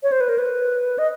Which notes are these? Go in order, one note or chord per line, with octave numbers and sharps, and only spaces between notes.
C#5
C5
B4
A#4
B4
D#5